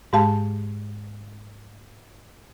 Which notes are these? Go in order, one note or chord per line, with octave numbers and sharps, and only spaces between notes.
G#2 G#3 G4 F5 A5